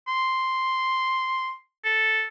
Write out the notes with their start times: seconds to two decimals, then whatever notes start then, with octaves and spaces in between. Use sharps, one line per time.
0.08 C6
1.84 A4